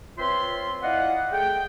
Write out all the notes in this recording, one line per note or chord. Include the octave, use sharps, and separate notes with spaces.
C4 F4 B4 C#5 E5 C6
E4 D5 D#5 F5 F#5
A3 G#4 G5